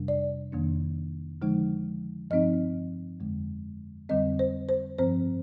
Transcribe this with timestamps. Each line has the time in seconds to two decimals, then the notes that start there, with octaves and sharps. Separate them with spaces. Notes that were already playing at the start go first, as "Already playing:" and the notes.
Already playing: F2 C3 G3 D4
0.08 D5
0.52 F2 D#3 A#3 D4
1.42 D3 F3 G#3 D#4
2.30 G2 F3 C4 D#4 D#5
3.20 F2 D3 G#3
4.09 F2 D3 G3 C4 D#5
4.39 C5
4.69 C5
4.99 G2 F3 C4 C5